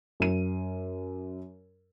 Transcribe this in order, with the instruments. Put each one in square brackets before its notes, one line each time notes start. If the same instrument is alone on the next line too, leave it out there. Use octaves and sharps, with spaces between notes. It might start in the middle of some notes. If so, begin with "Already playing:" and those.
[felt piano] F#2 D#7